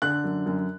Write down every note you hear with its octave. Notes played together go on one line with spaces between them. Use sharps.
D3 F#6
F#2
F#2